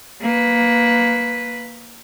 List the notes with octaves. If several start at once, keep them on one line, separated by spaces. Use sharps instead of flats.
A#3 B4